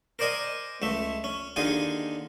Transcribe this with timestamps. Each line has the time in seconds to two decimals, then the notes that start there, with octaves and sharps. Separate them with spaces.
0.19 A#4 C5 D5 D#5 G#5
0.82 C#2 A3 E5
1.24 C#4
1.56 D#2 D3 D#4 F4 G#4 G#5